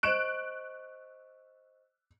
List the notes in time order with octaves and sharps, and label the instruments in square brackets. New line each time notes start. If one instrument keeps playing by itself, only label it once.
[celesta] C5 D#5 C#6 [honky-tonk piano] F#6 D7 E7